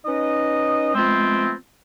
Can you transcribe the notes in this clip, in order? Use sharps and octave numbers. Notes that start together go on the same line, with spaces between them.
C#4 D#4 B4 D#5
F3 G#3 A3 B3 C4